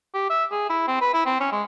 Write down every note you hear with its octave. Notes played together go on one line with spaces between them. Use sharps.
G4
E5
G#4
E4
C4
B4
E4
C4
C#4
G#3